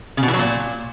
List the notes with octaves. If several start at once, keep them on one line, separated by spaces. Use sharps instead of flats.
C#3
B2
E3
F#3
A#2